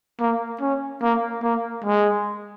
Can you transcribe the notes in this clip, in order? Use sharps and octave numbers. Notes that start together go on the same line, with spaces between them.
A#3
C#4
A#3
A#3
G#3